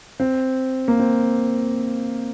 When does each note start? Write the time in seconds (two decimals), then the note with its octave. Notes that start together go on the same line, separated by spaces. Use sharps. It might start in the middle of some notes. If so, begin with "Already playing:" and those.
0.20 C4
0.88 A#3
1.00 C4